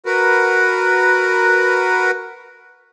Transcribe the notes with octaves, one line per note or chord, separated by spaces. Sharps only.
F#4 A#4 B4